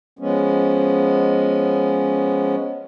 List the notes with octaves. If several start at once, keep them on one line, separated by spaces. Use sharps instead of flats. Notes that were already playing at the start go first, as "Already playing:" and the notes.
F3 G#3 B3 C#4